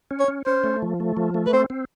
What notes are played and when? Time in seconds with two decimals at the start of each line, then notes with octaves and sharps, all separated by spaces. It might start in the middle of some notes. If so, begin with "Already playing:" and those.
0.11 C#4
0.20 C#5
0.28 C#4
0.46 C#4 C5
0.64 A3
0.82 F3
1.00 A3
1.17 F3
1.34 A3
1.46 B4
1.53 C4 C5
1.70 C4